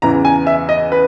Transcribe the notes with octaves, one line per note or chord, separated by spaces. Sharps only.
E2 C#3 E3 A#5
G#5
E5
D#5
B4